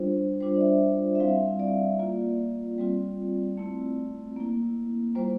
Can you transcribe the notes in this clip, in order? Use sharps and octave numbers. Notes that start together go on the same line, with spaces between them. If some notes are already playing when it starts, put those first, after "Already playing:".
Already playing: G3 D4 F4 C5
G3 D4 F4 C5
D5
E5
E5
G3 C4 E4 F5
D5
A#3 F4
G3 C4 F4
A3 C4 E4
A#3 E4
G3 A#3 F4 C5